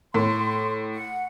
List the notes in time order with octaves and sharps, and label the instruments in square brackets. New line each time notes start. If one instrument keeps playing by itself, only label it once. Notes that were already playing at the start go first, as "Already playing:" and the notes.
[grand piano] A2 [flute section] C6
[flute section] F#5